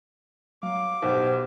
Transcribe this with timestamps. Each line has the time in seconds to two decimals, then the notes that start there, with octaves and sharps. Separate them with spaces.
0.63 F#3 F5 D6
1.02 B1 B2 G4 C5